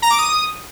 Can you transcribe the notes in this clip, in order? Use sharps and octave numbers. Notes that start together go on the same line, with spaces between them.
A#5
D6
D#6